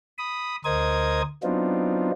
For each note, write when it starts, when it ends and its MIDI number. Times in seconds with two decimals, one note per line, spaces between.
0.18 0.56 83
0.18 0.56 87
0.65 1.22 38
0.65 1.22 70
0.65 1.22 72
0.65 1.22 75
0.65 1.22 87
0.65 1.22 92
1.43 2.11 54
1.43 2.11 59
1.43 2.11 60
1.43 2.11 62
1.43 2.11 63
1.43 2.11 65